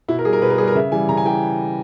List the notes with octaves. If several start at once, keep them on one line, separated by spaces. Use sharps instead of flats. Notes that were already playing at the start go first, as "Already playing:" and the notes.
B2 E4
A#4
G3 G#4
A#4
B2 B4
A#4
G3 G#4
A#4
C#3 E5
E3 G3 G#5
C#3 A#5
G#5
E3 G5